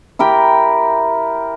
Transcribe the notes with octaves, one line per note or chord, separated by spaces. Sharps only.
E4 G4 A#4 G5